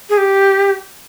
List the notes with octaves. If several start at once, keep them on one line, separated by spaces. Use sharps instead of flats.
G#4
G4